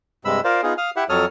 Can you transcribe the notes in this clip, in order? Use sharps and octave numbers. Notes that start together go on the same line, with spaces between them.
G2 C3 G#3 B5 E6
F4 A#4 C5 D5 F5
B3 D#4 F4 G#4
F5 D#6 F6
E4 G4 E5 F#5
F2 F#3 A4 C#5 D#6 F6